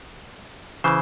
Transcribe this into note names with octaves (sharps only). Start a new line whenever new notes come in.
C#3 E3 C5